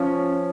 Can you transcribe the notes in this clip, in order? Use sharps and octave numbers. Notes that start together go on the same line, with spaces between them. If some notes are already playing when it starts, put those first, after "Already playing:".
Already playing: F3 C#4